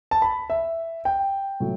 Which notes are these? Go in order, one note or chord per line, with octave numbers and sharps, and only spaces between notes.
A5
B5
E5
G5
A2 F#3